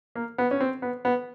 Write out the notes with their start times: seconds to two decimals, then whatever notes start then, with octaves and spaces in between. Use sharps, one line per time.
0.15 A#3
0.38 B3
0.51 C#4
0.60 C4
0.82 B3
1.05 B3